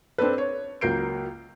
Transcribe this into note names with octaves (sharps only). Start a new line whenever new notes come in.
C4 D4 A4 B4
C#5
C#2 F#3 A#3 G6 C7 D7